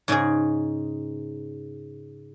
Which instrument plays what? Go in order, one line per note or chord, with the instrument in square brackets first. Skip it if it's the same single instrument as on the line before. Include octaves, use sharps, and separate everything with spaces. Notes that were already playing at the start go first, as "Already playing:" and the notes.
[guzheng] G#2 C#3 G#3 G#4